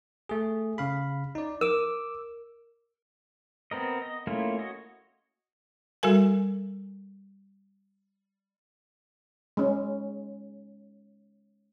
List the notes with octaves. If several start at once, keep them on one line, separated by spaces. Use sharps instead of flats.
A3 G#4
C#3 F5 B5
D#4 D5
A#4 D6 E6
B3 C4 A#4 D#5
D#5
A3 A#3 C#4 E4 F4
F#4 C#5 D#5
G3 F#4 A4 A#4 G#5
G#3 C#4